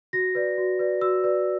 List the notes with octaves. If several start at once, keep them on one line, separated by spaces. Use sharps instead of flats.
F#4 A#6
B4 D5
F#4
B4 D5
F#4 E6
B4 D5